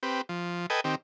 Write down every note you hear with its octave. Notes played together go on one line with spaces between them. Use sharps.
C4 G4 B4
F3
A4 B4 D#5 G5 G#5
D#3 C4 G4